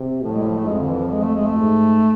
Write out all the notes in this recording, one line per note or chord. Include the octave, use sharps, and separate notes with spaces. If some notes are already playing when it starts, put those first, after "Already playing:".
Already playing: C3
A2 F3
G#3
F3
A3
F2 G#3
D3
E3
F3
G#3
A3
G#3
A3
G#2